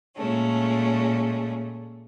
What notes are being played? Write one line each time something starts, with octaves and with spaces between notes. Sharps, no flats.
A#2 G#3 A3 C#4